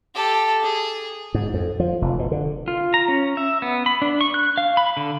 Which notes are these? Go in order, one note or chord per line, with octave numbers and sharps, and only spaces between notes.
G4 A4
G#4
G#2
F2
F3
F1
B2
D3
F4
A#5
C#4
E5
B3
B5
D4
C#6
F#6
F5
B5
D3